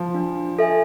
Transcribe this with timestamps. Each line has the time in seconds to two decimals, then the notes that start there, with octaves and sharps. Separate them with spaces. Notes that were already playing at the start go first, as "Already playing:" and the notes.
Already playing: F3
0.15 D4
0.59 A4 E5 G#5